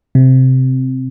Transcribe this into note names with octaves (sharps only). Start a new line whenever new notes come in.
C3